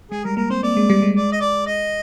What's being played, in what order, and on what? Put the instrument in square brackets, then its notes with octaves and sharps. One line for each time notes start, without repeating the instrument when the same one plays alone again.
[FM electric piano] G#3 [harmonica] G#4
[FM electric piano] G3 [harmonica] A#4
[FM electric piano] A#3 [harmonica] A#4
[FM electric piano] C4 [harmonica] C5
[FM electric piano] A#3 [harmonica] D5
[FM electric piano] G#3
G3
G#3
[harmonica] D5
D#5
D5
D#5